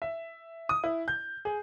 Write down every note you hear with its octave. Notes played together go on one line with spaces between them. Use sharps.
E5
D#6
E4
G6
G#4